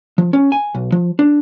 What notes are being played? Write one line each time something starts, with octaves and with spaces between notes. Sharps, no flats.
F3
C#4
G#5
B1
F3
D4